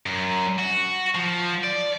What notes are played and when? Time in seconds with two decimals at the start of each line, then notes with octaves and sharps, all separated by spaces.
0.06 F#2
0.59 F#4
1.16 F3
1.64 D5